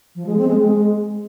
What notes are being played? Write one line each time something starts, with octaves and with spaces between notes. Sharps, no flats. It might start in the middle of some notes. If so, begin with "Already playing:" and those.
F3
G#3
C4
G#3
G#3